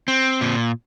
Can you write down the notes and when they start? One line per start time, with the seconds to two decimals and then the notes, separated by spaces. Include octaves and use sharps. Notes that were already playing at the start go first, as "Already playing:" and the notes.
0.08 C4
0.41 A#2